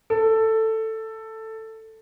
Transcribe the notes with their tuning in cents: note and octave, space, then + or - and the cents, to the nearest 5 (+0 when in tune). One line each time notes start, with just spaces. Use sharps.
A4 +10